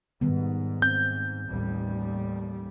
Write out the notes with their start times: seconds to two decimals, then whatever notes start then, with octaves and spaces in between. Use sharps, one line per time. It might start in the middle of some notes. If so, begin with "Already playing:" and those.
0.21 G#2 D#3 G3 B3
0.82 C4 G6
1.48 A1 D#2 G3